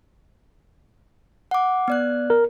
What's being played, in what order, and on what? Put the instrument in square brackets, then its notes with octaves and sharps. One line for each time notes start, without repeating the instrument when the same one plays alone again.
[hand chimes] F#5 D6
B3 D5 F#6
[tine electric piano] A#4